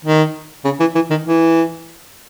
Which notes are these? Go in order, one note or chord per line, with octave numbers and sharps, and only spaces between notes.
D#3
C#3
E3
E3
D#3
E3